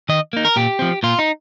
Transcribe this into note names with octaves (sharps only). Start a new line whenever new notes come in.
D#3 D#5
A#3 D#4
A#4
A#2 G4
F3 C4
A#2 F4
D#4